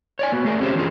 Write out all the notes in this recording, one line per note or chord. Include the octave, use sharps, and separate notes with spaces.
C#5 D5 G#5
A#3 B3 F#4
A3 G#4 A#4 D5
C4 C#4 F4 G4 C5
E3 F#3 D4 F4 G#4